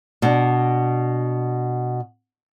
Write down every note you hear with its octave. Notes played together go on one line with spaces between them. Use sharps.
B2 D4